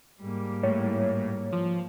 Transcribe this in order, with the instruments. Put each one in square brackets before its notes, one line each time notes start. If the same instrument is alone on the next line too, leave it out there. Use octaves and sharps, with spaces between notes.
[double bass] G#2 A#3 [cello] G3
[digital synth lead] A2 [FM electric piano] C#5
[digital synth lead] F3